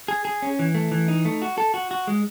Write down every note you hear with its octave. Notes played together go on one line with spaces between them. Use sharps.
G#4
G#4
C#4
E3
A3
E3
D#4
A3
F#4
A4
F#4
F#4
G#3